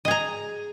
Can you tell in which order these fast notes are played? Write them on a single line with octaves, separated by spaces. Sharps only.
D#5 G#4 A#5